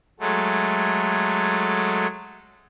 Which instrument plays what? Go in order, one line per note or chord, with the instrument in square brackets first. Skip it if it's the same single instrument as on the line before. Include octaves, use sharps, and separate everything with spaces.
[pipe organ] F#3 G#3 A3